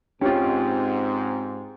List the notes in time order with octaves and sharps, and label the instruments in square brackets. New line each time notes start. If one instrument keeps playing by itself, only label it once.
[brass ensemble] G#2 [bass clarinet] C4 [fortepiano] C#4 F4 [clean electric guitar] G4